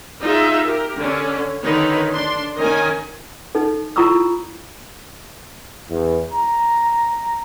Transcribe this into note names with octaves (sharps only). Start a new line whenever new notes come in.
D#4 F4 G#4 E5
G4 A#4
D3 C#4
D3 D#3 D#4 B4 C#5
D4 C6
D#3 C#4 A#4 D#5 G#5
D#4 A4
E4 F4 A#5 C#6 D#6 E6
E2
A#5